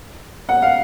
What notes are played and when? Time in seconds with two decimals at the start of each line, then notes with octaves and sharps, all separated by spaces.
0.49 F#5
0.62 F5